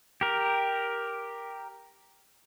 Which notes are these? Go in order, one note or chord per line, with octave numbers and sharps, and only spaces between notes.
G4 A#4